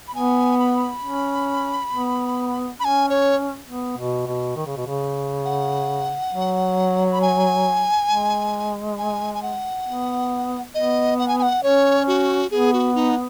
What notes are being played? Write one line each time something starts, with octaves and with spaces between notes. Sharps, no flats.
B5
B3 G#5
B5
C#4
B3
C#4 G#5 B5
C#5
B3
B2
B2
D#3
C#3
B2
C#3
F#5
F#3
B5
G#5
G#3
G#5
G#5
F#5
B3
B3 D#5
F#5
G#5
G#5
F#5
C#4 C#5
F#4
B3 G#4
F#4
D#4